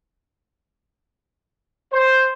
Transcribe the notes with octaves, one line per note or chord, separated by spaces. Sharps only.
C5